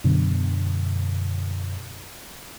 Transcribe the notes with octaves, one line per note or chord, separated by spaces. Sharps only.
F#2 B2 D3